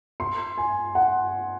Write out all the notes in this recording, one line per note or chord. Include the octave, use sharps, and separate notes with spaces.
C6
G#5
F#5